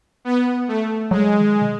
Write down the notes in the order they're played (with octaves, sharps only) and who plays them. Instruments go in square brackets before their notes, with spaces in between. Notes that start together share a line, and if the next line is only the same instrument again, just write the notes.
[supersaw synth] B3
A3
[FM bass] F#3 [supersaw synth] G#3
[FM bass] D#3
B2